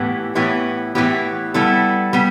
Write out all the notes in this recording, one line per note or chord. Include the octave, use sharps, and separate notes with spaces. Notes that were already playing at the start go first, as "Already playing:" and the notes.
Already playing: A2 E3 B3 E4 G4
A2 E3 B3 E4 G4
A2 E3 B3 E4 G4
G3 B3 E4 A4
G3 B3